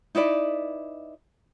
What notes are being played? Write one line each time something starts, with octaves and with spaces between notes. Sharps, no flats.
D#4 E4 B4 D5